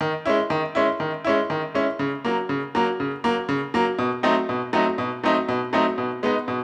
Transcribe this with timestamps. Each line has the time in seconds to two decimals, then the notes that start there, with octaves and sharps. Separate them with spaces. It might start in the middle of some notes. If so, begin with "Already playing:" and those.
0.01 D#3
0.26 G#3 C#4 E4
0.50 D#3
0.75 G#3 C#4 E4
1.00 D#3
1.25 G#3 C#4 E4
1.50 D#3
1.74 G#3 C#4 E4
1.99 C#3
2.25 F#3 A#3
2.49 C#3
2.75 F#3 A#3
3.00 C#3
3.24 F#3 A#3
3.49 C#3
3.74 F#3 A#3
3.99 B2
4.23 F#3 A3 C4 D#4
4.49 B2
4.73 F#3 A3 C4 D#4
4.98 B2
5.24 F#3 A3 C4 D#4
5.49 B2
5.73 F#3 A3 C4 D#4
5.98 B2
6.23 G#3 B3 D#4
6.48 B2